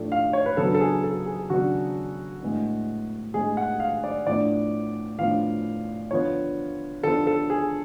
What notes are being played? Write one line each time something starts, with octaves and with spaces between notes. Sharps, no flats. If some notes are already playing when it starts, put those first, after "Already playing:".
Already playing: A2 F3 A3 D4
F5
C#5
B4
C#3 F#3 B3 D4 A4
A4
G#4
A4
G#4
C#3 F#3 B3 D4 F#4
A2 G#3 B3 D4
A2 G#3 B3 D4 G#4
F#5
F5
D5
A2 F3 B3 D4 D5
A2 F3 B3 D4 F5
D3 F3 B3 C#5
D3 F3 B3 A4
A4
G#4